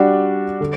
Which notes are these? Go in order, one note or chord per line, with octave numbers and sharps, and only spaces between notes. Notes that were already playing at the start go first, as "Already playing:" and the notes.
Already playing: G3 D4 F#4
D3